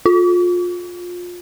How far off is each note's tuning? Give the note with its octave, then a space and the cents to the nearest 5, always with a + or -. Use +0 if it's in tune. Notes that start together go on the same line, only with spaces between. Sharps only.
F4 +25